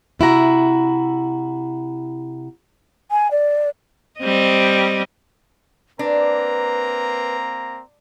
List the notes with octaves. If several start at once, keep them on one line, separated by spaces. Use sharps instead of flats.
C3 E4 F#4 A#5
G#5
D5
G3 C4 D#5
A#3 C4 D4 B4 A#5